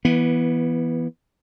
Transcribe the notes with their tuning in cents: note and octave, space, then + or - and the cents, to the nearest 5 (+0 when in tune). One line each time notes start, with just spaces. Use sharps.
E3 +0 B3 -20